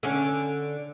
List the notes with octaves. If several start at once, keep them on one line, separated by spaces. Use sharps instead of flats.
D3 C#4